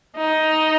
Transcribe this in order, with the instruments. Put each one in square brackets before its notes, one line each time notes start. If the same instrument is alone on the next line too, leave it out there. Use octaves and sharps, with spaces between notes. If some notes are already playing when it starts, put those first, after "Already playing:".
[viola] D#4